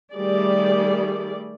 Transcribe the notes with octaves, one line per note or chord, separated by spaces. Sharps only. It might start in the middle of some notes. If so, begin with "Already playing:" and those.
D#3 G3 A3 G#4 D5